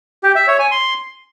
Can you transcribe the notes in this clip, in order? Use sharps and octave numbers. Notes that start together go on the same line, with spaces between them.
G4
E5
C#5
G#5
C6